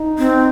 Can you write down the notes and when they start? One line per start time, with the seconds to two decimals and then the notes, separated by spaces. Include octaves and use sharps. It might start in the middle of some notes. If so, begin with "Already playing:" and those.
Already playing: D#4
0.19 C4